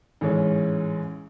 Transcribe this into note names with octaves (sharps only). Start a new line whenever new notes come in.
A1 G#2 E3 G#3 C#4